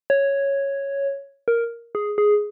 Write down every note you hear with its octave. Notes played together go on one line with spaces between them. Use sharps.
C#5
A#4
G#4
G#4